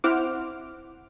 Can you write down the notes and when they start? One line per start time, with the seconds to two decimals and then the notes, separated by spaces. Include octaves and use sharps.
0.04 C4 E4 C5 F#5 D6 F6